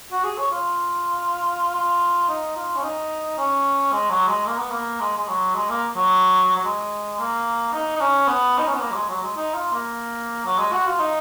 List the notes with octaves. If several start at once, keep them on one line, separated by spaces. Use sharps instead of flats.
F#4
G#4
C#5
F4
F4
D#4
F4
C#4
D#4
C#4
G#3
F#3
G#3
A#3
B3
A#3
G#3
G#3
F#3
G#3
A#3
F#3
F#3
G#3
A#3
D#4
D#4
C#4
B3
D#4
C#4
B3
A#3
F#3
G#3
F#3
G#3
D#4
F4
A#3
F#3
G#3
F#4
F4
D#4